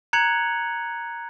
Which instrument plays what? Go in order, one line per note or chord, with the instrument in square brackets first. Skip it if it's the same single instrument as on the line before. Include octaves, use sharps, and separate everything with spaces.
[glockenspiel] A#5 F#6 G#6 C#7 F7 F#7